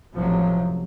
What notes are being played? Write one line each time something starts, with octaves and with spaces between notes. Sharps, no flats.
A1 F#2 C3 F3 F#3